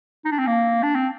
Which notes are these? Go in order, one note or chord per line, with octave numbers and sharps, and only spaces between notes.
D#4
D4
C4
A#3
D4
C4